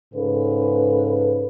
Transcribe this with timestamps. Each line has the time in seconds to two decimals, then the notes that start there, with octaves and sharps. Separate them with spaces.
0.14 G#2 C#3 A4 B4